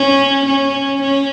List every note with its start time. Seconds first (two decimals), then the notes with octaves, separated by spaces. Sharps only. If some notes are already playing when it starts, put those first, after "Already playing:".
Already playing: C#4
0.46 C#4
1.02 C#4